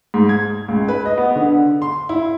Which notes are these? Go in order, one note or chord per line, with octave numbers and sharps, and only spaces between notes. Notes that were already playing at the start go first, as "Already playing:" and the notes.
G#2
G#6
C#2
B4
D#5
B3
D3
C6
E4